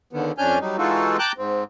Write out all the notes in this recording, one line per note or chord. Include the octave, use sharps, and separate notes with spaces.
D#2 D3 D#3 B3
F2 C#4 D4 G#5 F6 G6
F#3 G3 D#4
E3 G#3 D#4 F4 F#4 A4
G5 A5 A#5 D6 F#6 G6
G#2 C4